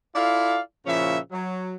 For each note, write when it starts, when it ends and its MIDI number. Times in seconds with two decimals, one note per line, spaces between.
0.15 0.59 64
0.15 0.59 65
0.15 0.59 69
0.15 0.59 74
0.15 0.59 77
0.86 1.17 46
0.86 1.17 49
0.86 1.17 53
0.86 1.17 61
0.86 1.17 64
0.86 1.17 76
1.31 1.74 54